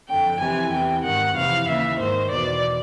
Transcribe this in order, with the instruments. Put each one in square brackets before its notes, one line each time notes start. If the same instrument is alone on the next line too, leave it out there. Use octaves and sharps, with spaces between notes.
[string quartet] F2 D3 G5
F2 C3 E3 G#5
E2 C3 E3 G5
G#2 D#3 F#5
F2 C3 E3 F5
D#2 C#3 E3 E5
G#2 D#3 C5
E2 B2 D5